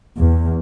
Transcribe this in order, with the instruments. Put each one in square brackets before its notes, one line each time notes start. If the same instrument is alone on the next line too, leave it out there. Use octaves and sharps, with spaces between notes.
[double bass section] E2